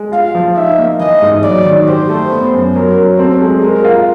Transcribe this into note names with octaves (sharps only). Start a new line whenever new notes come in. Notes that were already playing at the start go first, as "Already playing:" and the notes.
Already playing: G#3
F4 F5
F3
D#4 E5
A#3
E3 D#5
G#2
F#3 D5
D#3
G4 C5
A3
B3
F#2
F#3 A#4
F#3
C4 A4
G#3
G#3 A#4
F4